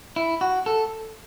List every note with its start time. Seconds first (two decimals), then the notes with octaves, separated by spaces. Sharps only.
0.16 E4
0.41 F#4
0.66 A4